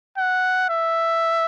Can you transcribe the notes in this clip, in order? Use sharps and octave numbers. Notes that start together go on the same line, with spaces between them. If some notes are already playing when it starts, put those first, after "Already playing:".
F#5
E5